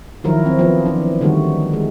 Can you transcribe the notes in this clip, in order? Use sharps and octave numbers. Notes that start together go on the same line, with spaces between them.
D#3 F3 F#3 E4 A#4
C4
F3 B3
E3 D4
D3 D#3 G3 A3 F#4
G#3